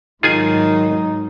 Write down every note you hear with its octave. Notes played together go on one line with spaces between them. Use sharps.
G#2 D#3 F#3 D#4 F4 G#4 G#5